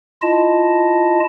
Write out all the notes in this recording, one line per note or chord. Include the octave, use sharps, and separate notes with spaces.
E4 F4 D#5 A5